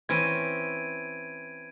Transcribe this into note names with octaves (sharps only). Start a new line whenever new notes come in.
E3 C4 C#4 G#6 D7 D#7